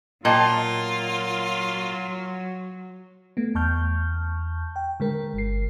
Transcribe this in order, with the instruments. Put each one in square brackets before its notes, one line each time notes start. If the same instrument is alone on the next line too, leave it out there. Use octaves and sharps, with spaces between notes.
[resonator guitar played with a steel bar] A#2 [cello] F#3 [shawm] F4 [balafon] D#5 G5 A5
[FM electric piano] A3 B3
E2 A5 C#6 F6 G6
G5
D3 G#3 A#4
G1 C7